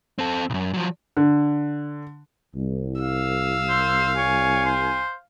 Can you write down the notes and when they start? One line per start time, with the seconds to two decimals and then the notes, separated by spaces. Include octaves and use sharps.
0.19 C4 A4
0.50 B1 F#2
0.74 F3 F#3
1.17 D3
2.55 C2
3.01 F5 E6
3.69 C5
4.17 C#5 G#5
4.65 C5